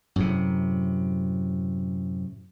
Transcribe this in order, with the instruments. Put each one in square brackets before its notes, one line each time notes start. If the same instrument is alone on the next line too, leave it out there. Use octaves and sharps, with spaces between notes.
[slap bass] F#2 A2 C3